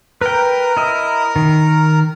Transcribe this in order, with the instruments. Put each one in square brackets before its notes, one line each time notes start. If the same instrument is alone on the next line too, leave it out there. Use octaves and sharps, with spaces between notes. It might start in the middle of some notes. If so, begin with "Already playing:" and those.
[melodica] A#4 A#5 [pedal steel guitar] B4 G5
[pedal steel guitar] E4 D#5
D#3